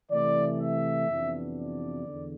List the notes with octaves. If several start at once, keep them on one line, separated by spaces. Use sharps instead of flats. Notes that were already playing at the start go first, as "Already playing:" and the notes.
C3 E3 A3 D5
E5
F2 C3 E3 B3 D4
D5
E2 D3